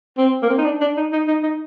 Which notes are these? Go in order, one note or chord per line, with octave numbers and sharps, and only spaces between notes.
C4
A#3
C4
D#4
D4
D4
D#4
D#4
D#4
D#4